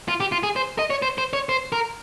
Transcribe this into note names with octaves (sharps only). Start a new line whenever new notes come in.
F4
G4
F4
G#4
C5
D#5
C#5
C5
C5
C#5
C5
A#4